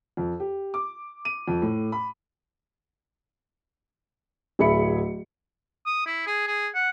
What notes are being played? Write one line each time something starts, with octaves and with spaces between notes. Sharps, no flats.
F2
G4
D6
D#7
F2
A2
B5
D1 G#4 E5 B5 C#7
D#6
E4
G#4
G#4
F#5